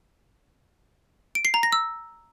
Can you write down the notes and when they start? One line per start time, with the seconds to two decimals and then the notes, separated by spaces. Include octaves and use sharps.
1.35 D7
1.45 C7
1.54 A#5
1.63 A#6
1.72 E6